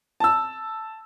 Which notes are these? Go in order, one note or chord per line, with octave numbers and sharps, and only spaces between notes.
A5 E6